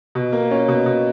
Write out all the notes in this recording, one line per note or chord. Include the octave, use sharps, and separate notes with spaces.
B2
A#3
C#4
B2
B2